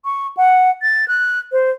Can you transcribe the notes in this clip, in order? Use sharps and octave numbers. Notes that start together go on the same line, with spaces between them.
C#6
F#5
A6
F#6
C5